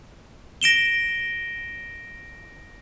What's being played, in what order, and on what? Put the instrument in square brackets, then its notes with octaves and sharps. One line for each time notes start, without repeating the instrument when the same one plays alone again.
[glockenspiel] A#6 D7 E7 G7